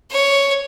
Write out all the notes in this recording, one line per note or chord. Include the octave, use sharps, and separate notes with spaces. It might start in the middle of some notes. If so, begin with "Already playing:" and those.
C#5